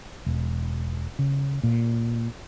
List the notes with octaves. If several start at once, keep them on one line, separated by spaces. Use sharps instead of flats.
E1
C#3
A#2